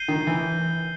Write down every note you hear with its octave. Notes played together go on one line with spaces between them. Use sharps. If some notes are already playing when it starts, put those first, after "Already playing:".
Already playing: G6 C7 D#7 G7
D#3
E3